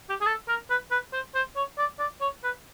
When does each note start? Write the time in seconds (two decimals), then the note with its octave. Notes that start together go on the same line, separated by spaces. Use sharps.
0.10 G4
0.21 G#4
0.26 A4
0.48 A#4
0.70 B4
0.91 B4
1.13 C5
1.35 C5
1.56 C#5
1.78 D5
1.99 D5
2.21 C#5
2.44 B4